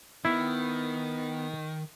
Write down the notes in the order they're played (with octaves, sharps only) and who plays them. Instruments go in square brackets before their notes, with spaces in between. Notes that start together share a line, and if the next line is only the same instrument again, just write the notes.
[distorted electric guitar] D#3 [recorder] B3 [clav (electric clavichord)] E4